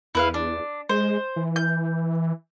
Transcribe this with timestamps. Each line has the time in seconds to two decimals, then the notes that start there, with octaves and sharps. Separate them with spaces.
0.15 E2 E4 B4 F5
0.34 D4
0.89 G#3 C5
1.36 E3
1.56 G6